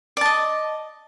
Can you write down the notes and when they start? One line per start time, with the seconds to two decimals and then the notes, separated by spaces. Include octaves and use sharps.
0.17 D5
0.21 A5
0.26 D#5